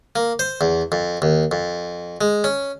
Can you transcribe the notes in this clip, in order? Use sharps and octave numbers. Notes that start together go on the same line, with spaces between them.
A#3
C5
E2
F2
D#2
F2
G#3
C#4